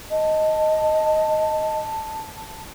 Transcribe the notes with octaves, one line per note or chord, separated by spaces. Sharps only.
D#5 A5